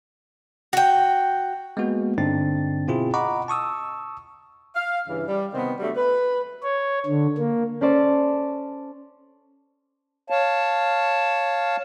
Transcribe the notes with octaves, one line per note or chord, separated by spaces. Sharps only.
F#4 G5
G#3 A#3 B3 F#4
G2 D3 C4 D4 D#4 A6
B2 C4 E4 F4 G#4
D#5 F#5 A#5 B5 C#6 D6
A5 C#6 D#6 E6
F5
G2 C#3 E3
G3
C3 D#3 B3 C4
F#3 G3 A3 D4
B4
C#5
D3
A#3
C#4 A4 C5 D5 A5 C#6
C#5 F5 A5